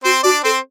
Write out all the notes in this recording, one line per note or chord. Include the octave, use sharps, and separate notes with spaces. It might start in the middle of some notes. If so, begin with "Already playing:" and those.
C4 F#4 C5
D4 F#4 D5
C4 A4 C5